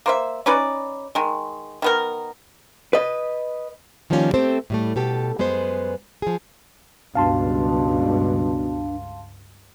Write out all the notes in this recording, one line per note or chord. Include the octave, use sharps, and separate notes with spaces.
A#3 C5 E5
C#4 D#4 B4 D5
D#3 G#3
D#3 B3 A#4
B4 D#5
D#3 F3 G3 A#3 C#4 F4
A3 C4 G4 A4 C5
A2 G3 A3
B2 G4 A4
F#2 G#3 B3 B4 C5
F3 G#4
C#2 G2 B2 D4 F5 A5 C6